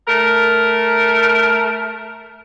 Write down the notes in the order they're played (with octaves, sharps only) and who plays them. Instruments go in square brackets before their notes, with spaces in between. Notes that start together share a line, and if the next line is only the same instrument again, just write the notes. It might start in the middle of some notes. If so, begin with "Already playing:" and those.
[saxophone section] A3 A#4